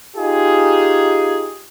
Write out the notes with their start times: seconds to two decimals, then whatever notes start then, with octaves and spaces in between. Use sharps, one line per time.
0.16 D#4 F4 G4 G#4